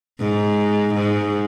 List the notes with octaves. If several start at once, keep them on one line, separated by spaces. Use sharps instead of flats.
G#2
G#2